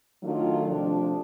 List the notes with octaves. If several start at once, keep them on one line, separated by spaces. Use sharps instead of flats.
D#3 F#3 A3 D4 F4
C3 F3 A3 D4